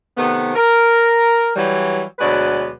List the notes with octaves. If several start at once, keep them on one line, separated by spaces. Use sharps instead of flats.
C3 D#3 A3 B3
A#4
E3 F#3 G3
D2 B2 F#3 G#3 B4 D5